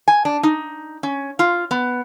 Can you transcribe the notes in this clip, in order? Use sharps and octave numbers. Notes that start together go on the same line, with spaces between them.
G#5
D4
D#4
C#4
F4
B3